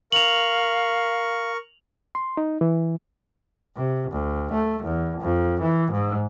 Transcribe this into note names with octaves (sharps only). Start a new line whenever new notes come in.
A#4 F5 C#6 F7 F#7
C6
D#4
E3
C3
D2
A3
E2
F2
E3
G#2